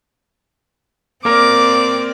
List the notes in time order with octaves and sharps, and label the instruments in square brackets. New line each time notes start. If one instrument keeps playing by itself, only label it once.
[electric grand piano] A#3 A#4 [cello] C4 D5 [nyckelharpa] D6